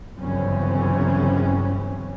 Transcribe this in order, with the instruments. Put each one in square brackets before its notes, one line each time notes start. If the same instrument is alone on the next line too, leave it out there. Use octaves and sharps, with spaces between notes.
[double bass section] G1 F#2 C#3 E3 C4 C#4